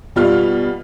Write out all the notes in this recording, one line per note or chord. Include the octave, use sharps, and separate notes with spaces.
B2 G3 F4 F6